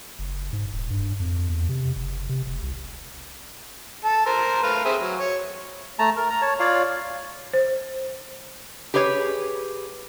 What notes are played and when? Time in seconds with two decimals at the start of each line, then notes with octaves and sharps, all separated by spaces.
0.19 F#1
0.53 G#2
0.73 D#1
0.91 G2
1.20 F2
1.50 E2
1.69 C3
1.96 F#1
2.29 C3
2.47 F1
2.63 C2
4.05 A4 A5
4.26 A#4 C5
4.63 A3 B4 F5
4.85 C4 G#4 E5
5.00 F#3
5.19 C#5
5.99 A3 A5 A#5
6.16 A#4
6.30 A#5
6.42 C#5 A5
6.60 F4 C#5 D5 F5
7.53 C5
8.94 G4 G#4 B4 C#5